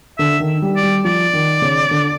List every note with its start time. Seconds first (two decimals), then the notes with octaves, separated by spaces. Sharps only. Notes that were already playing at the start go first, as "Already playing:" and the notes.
0.18 D3 E5
0.40 D#3
0.62 G3
0.76 D5
0.83 G3
1.05 F3 D5
1.33 D#3
1.62 C#3
1.91 D3